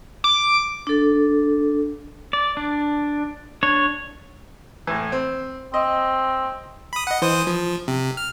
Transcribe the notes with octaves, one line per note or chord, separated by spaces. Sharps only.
D6
D4 A4
D5
D4
D4 C#5
A2 E3
C4
C4 D#5
B5 D#6
D#5 F#5
E3 C5 D#6
F3
C3
F6